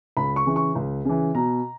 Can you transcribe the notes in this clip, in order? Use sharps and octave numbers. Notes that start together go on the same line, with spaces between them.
C#2 B5
C#6
C#3 E3
C#6
C#2
C#3 E3
B2 A#5